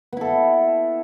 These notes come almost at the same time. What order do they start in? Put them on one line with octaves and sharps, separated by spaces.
B3 E4 A4